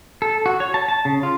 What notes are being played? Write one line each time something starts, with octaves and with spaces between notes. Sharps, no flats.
A4
F#4
C#5
A5
A5
C#3
F4